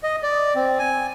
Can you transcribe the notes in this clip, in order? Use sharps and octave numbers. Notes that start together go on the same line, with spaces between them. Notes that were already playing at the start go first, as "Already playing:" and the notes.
D#5
D5
C4
G#5